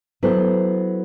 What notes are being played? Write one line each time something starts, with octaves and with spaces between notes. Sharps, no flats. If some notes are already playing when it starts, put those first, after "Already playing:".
F#3 B3 E4 A4 C5